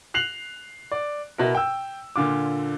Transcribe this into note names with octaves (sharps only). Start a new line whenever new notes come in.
F#6 C7 F7 F#7
D5
B2 E4 A#4
G5 E6
A#2 D3 F4 D6